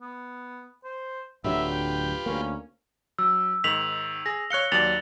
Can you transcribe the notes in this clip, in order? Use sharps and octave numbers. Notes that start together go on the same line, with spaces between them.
B3
C5
D1 D3 F#3 F4 G4 B4 E5
G5
D2 A#3 C#4
F#3 E6
G#2 D#3 B6 F7 F#7
G#4 A#6
C#5 F5 F#6 C#7 G7
D#2 F#3 D5 A6 F7 F#7